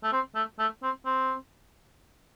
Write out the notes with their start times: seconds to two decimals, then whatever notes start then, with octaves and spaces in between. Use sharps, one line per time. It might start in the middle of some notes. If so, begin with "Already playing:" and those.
0.03 A3
0.13 C4
0.35 A3
0.59 A3
0.83 C4
1.06 C4